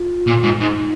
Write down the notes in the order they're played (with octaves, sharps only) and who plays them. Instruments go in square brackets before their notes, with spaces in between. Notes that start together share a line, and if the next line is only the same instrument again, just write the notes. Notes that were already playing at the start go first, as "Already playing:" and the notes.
Already playing: [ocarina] F4
[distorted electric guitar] A#2
G#2
[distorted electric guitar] G#2 [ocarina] D#4